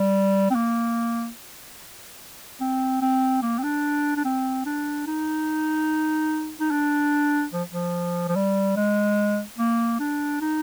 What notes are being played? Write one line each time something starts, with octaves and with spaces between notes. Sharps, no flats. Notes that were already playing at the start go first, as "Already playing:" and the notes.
Already playing: G3
C4
A#3
C4
C4
A#3
C4
D4
D4
C4
D4
D#4
D#4
D4
F3
F3
F3
G3
G#3
A#3
D4
D#4